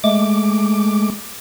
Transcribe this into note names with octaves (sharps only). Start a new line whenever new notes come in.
G#3 A3 D6